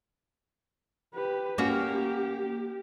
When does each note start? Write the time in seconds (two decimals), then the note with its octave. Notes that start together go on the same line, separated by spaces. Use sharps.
1.14 G4 B4
1.58 A#3 C#4 F#4 G4